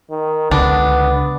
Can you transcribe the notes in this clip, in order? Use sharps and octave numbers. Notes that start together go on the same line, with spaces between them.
D#3
C#2 D3 B3 D4